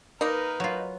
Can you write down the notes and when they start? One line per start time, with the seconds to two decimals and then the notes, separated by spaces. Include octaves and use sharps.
0.21 A#3 D#4 A#4 B4
0.60 F#3 F4